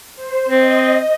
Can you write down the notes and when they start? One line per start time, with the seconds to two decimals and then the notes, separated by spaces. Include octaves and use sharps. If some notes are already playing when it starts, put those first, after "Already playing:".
0.15 C5
0.49 C4 D#5